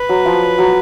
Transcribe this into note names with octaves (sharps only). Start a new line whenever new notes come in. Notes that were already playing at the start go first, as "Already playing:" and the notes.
Already playing: B4
F#3
F3
F#3